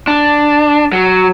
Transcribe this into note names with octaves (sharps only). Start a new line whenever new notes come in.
D4
F#3